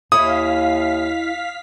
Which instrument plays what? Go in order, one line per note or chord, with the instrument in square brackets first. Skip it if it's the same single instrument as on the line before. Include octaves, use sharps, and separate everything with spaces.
[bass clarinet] D#2 [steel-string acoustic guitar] E4 C#5 D#5 [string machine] F5 B6 [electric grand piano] D#6